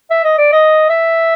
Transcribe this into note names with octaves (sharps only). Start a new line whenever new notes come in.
E5
D#5
D5
D#5
E5